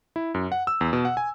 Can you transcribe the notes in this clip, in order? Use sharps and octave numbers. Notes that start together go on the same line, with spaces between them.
E4
F#2
F#5
E6
E2
B2
F#5
G#5